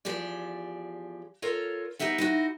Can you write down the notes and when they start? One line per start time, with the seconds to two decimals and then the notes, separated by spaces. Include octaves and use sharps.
0.05 E2 F3 G4 G#4 D5
1.42 F4 A4 A#4 C#5
1.99 B3 D#4 G4 E5 F#5
2.18 D#4 E4 F#4